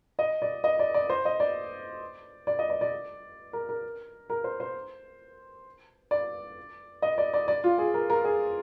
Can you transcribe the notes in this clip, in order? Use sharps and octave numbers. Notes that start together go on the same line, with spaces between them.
D#5
D5
D#5
D5
D5
C5
D#5
D5
D5
D#5
D5
D5
A#4
A#4
A#4
C5
C5
D5
D#5
D5
D5
D5
F4
G#4
A#4
A#4
G#4